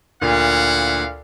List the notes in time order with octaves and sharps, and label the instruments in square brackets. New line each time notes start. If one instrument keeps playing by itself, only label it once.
[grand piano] D2 A#2 [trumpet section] E4 F5 F#5